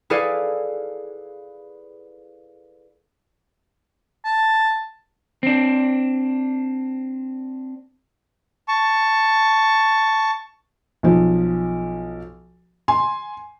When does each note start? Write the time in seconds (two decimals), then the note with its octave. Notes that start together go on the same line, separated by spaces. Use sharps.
0.10 E4 G#4 A4 B4 D5 F5
4.25 A5
5.43 C4 D4
8.68 A5 C#6
11.03 B1 F3
12.88 G#5 C6